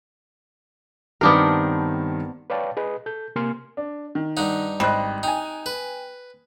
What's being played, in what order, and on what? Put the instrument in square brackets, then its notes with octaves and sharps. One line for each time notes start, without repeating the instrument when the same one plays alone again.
[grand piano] G2 D#3 C4 [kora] B3 D4 A#4
[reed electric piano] B4 C#5 D5 F5 G5 A5
G#4 B4 D#5
A4 G6
C3 A#3 A#4 G#5 C6 F6
[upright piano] D4
D#3
[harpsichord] G2 D#4 [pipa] F#5
[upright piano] G#1 D#5 F#6 [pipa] G3 C4
[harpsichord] D#4 [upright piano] G5 G#5
[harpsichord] B4